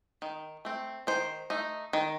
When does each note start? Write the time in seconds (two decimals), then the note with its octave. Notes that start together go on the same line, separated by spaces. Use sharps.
0.22 D#3
0.65 A3 C4
1.07 D#3 C5
1.50 A3 D#4
1.93 D#3